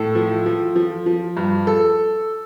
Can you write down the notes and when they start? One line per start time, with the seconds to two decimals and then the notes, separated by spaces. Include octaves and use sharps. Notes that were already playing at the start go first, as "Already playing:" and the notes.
Already playing: A2 A4
0.15 F3
0.46 F3
0.76 F3
1.06 F3
1.37 G2
1.67 A4